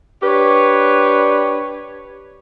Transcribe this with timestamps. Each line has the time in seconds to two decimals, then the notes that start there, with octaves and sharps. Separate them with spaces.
0.22 D4 G4 B4 C#5